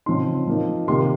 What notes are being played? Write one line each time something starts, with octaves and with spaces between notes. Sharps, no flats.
C#3 F3 C4 D#4 C6
F3 A#3 D#4
C3 D#3 A#3 C6